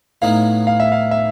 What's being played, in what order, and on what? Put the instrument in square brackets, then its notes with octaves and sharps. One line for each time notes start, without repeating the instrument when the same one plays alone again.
[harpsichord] A2 F#3 B3 D#4 [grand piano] F5
[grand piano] F5
E5
F5
E5